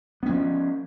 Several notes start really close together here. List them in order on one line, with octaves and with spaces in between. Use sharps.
B3 C#4 F3